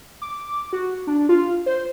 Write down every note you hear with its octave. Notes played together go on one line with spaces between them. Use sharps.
D6
F#4
D4
F4
C5